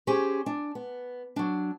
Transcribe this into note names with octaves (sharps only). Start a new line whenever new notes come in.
C#4 G4 G#4 C5
D4
B3
F#3 D4